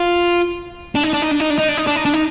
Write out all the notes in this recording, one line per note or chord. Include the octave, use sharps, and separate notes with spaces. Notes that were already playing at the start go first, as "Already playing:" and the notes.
Already playing: F4
D4
D#4
D4
D#4
D4
D#4
D4
D#4
D4
D#4
D4
D#4
D4
D#4